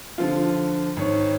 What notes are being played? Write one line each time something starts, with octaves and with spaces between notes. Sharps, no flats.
D3 F3 F4
G#1 C#5